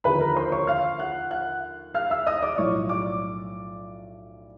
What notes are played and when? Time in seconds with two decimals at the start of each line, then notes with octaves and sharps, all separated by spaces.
0.04 D#2 D3 F3 B4 B5
0.20 A#4 A#5
0.36 C5 C6
0.52 C#5 C#6
0.67 F5 F6
1.00 F#5 F#6
1.31 F#5 F#6
1.94 F5 F6
2.10 E5 E6
2.26 D#5 D#6
2.43 D5 D6
2.58 B1 A2 F3 C#5 C#6
2.89 D5 D6